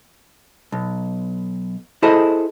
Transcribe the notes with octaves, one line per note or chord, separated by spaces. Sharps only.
B1
E4 G#4 A4 C5 D#5